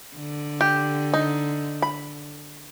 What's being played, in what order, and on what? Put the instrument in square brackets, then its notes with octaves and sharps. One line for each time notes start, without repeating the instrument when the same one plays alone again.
[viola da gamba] D3
[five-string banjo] G4
D#4
B5